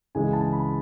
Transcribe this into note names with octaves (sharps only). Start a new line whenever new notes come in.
C#2 C#3 E3 G#3 G#5
A5
B5